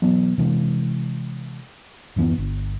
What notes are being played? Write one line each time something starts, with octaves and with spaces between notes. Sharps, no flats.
B2 E3 F#3 B3
C3 E3 G3 G#3
D1 F#2 E3 B3
G1